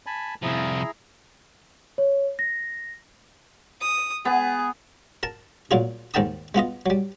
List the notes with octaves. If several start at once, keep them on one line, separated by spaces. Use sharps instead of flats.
G#5 A5 B5
C2 F3 E4 G#4 A#5
C#5
A#6
D#6
B3 G#4
A#4 A5
A#2 F#3 F4 G#4
D#2 G#2 A#4 G5 A5 D#6
G#3 B3 F4 D#5
F#3 G3